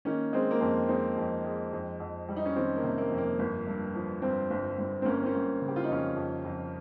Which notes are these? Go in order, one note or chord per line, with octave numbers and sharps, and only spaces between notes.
D#3 A#3 C#4
G#3 C4
A#3
F2 C4
G#3 C4 D#4
F2
G#3
F2
F2
G3
D#4
C#4
D#3 C4
A#3
C3
A#3
F2
A#3
G1
G2
F3
G2 C4
G1
G1
C4
G1 A#3 C#4
C4
A#3 C#4
G1
C#3
G4
F4
D#4
F2 C#4 F4
F2
F2